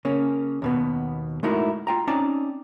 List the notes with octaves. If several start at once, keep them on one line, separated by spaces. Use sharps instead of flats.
C#3 A#3 C#4
D#2 B2 B3
G#3 A3 D#4 E4 F#4 A#4
F4 G5 A#5
C4 C#4 D#4 D5 A5 A#5